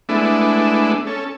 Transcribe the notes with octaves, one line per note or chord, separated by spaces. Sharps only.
G#3 A3 B3 D4 E4
C#4 A4